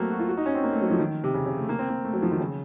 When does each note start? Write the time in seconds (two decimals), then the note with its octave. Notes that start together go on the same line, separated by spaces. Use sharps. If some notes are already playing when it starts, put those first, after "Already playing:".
Already playing: F#3 A3 A#3 C4
0.11 F#4
0.19 F4
0.28 F#4
0.37 D#4
0.46 C#4
0.54 C4
0.64 A#3
0.72 A3
0.81 F#3
0.91 F3
0.99 D#3
1.24 C3
1.34 C#3
1.46 C#3
1.58 A3
1.69 A#3
1.79 C4
1.89 A#3
2.04 A3
2.13 F#3
2.22 F3
2.31 D#3
2.40 C#3